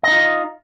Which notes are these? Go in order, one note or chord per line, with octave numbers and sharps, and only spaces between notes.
D#4 F4 D#5